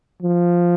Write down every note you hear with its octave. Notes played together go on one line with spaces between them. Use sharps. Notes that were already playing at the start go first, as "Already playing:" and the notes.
F3